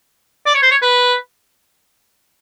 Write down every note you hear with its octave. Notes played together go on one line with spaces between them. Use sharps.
D5
C#5
C5
C#5
B4